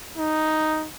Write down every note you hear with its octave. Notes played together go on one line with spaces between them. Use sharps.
D#4